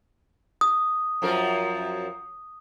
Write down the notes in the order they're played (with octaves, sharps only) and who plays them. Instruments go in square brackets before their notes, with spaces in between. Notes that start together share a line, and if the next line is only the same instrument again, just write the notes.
[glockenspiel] D#6
[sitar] F#2 F3 A#4